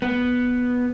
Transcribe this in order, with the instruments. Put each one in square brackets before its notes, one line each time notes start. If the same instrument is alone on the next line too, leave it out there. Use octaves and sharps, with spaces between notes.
[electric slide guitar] B3